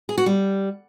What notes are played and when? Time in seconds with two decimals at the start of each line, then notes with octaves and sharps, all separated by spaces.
0.09 G#4
0.18 F#4
0.26 G3